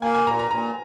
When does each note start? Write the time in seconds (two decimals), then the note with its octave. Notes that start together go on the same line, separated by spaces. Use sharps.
0.02 A#3 G#5
0.14 G#5
0.26 A#2 A#5
0.39 A#5
0.51 A#2 A#5